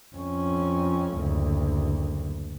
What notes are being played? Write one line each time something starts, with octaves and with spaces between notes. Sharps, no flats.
F2 C#4
F#1 D2